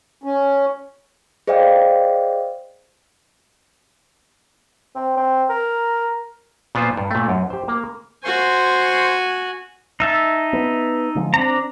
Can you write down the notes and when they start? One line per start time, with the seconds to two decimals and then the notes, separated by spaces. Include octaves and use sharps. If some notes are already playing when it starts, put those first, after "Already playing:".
0.24 C#4
1.47 G#4 C5 D5 D#5 F5 G5
4.95 C4
5.17 C4
5.49 A#4
6.75 A#2 B3 F4 C5
6.97 G2
7.11 A#2 A3
7.28 F#2
7.50 G4 C5
7.68 A#3
8.24 F#4 C5 G#5 C6 C#6
10.00 D#4 E5 A5
10.53 B3
11.15 D3 F3 G#3
11.34 C4 D4 A#5